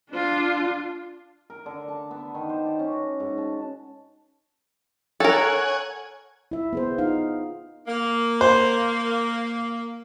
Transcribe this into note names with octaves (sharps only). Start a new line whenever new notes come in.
D4 F4
A#4
D3
A5
B3
D#3
C5
D5
C#4
F#4
G#2
A5
A4 A#4 C#5 F#5 G#5
E4 E5
B3 G#4 C5
D#4 F4 F5
A#3
C5